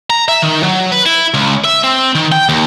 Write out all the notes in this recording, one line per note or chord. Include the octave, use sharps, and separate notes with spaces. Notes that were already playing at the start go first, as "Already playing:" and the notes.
A#5
E5
D#3
F#3
B4
E4
C#2
E5
C4
D#3
G5
D#2